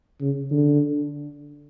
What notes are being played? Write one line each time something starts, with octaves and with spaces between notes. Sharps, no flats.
C#3
D3